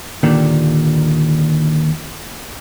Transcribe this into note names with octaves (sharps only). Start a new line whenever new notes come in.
D#2 A#2 D3 D#3